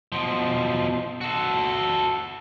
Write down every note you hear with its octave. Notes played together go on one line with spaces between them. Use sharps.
B2 F3
F#4 A4